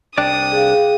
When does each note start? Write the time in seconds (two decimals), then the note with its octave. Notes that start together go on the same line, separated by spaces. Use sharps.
0.18 C2 D4 D5 G5 D#6
0.51 G#4 F5